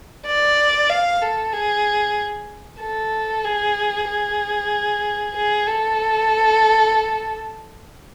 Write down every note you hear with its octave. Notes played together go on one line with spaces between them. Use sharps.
D5
F5
A4
G#4
A4
G#4
G#4
G#4
A4